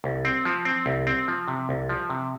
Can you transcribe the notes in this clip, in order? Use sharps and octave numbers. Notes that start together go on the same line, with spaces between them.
C2
C4
F3
C4
C2
C4
F3
C3
C2
F3
C3